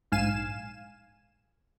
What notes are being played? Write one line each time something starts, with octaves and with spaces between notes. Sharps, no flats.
A#1 G#2 F5 G#5 E7